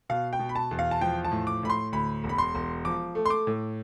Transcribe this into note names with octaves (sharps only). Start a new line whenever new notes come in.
B2 F5
G5
B2
B5
A5
E2
F5
A5
F3 G5
A5
A2
D6
A2 B5
C6
D2 B5
E1
B5
C6
E1
F3 D6
A3
C6
D6
A2